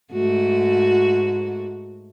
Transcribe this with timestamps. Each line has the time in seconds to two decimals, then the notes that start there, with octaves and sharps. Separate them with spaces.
0.12 G#2 A3 F#4